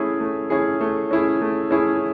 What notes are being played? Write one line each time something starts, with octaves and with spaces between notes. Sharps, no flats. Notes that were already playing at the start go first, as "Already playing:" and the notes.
Already playing: A3 C#4 E4 G#4
A3
C#4 E4 G#4
A3
C#4 E4 G#4
A3
C#4 E4 G#4